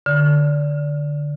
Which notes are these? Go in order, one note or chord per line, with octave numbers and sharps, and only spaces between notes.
D3